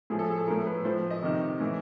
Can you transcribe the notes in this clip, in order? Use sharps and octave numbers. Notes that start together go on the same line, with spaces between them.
A2 F3 G#4
A4
G#4
A4
A2 F3 A#4
B4
A2 F3 C5
D#5
C3 D#3
A2 E3